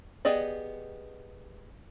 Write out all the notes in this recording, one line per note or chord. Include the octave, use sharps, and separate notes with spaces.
B3 G4 G#4 D5 D#5